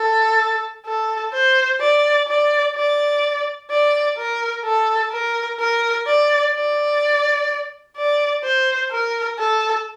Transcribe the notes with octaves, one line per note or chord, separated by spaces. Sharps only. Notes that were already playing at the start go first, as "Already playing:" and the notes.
Already playing: A4
A4
C5
D5
D5
D5
D5
A#4
A4
A#4
A#4
D5
D5
D5
C5
A#4
A4